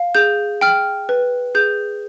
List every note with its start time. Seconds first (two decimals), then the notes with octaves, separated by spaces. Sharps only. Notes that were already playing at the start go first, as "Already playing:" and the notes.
Already playing: F5
0.15 G#4 G6
0.61 G5 F6
1.09 B4
1.55 G#4 G6